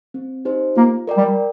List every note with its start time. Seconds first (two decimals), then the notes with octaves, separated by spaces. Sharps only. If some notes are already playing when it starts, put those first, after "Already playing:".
0.14 C4
0.45 D#4 G4 C5
0.76 A#3 F4
1.07 A#4 D5 G5
1.17 G3